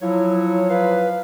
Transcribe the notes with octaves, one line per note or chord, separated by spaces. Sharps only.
F3 F#3 E4 C#5
B4 F5